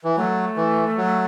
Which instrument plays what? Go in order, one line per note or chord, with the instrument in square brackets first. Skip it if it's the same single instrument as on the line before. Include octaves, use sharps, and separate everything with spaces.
[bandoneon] E3
[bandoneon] F#3 [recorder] A3
[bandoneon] E3
F#3